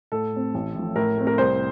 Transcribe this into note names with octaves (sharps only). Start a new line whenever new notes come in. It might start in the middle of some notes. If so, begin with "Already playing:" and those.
A2 A4
A3 C4
A1
A2 F3
A2 A#4
A3 C4
A#4
C2 C5